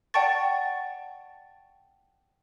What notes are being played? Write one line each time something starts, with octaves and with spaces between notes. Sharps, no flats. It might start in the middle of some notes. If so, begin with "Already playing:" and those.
D5 F#5 G5 A5 C#6 A6